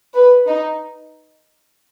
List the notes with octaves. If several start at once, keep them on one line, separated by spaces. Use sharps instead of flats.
B4
D#4